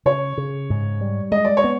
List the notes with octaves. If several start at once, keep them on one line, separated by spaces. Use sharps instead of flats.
C#3 C#5
C#3
G#2
G3
G#3 D#5
D5
C#5
B3